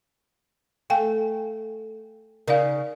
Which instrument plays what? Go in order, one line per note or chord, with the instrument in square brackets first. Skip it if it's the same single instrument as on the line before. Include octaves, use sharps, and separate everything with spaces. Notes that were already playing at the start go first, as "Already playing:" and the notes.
[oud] A3 [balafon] F5 G5 G#5
[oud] C#3 D#4 [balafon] A#4 D5 F5